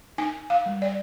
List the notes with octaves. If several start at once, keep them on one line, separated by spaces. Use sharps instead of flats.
D#4 G#5
F5
G3
D5